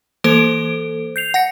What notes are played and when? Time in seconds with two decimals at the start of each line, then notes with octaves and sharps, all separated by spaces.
0.24 E3 A#3 A4 C5 D7
1.16 G6 C7 F7
1.34 F#5 A#6 C#7